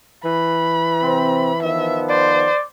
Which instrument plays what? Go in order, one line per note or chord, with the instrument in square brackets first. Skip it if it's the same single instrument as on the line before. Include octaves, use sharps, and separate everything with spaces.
[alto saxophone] E3 [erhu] B5
[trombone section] C3 C4
[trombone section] D#3 F3 B3 [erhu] E5
[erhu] C5 [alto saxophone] D5